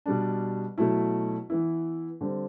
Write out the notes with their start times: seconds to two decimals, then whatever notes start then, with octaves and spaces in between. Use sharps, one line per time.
0.06 B2 G3 D4
0.78 B2 F#3 A3 E4
1.50 E3 B3 E4
2.21 D3 G3 C4